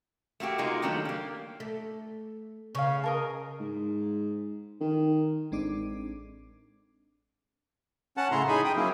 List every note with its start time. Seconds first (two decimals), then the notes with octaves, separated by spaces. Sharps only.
0.40 A3 A#3 F#4 G4
0.58 G#3 A#3 D#4 F4 F#4
0.82 D#3 F#3 G3 A3 C#4 D4
1.05 A#3 G4
1.60 A3
2.75 C#3 C#5 F5
3.04 A4 A#4 D#5
3.60 G#2
4.81 D#3
5.51 A1 G#3 C4 D4 D#4 D6
8.17 C#4 F#5 A5
8.31 A2 C#3 C#4 E4 A#5 C6
8.48 D#4 G#4 G#5 B5
8.64 G5 D#6
8.76 F#3 A#3 C#4 E4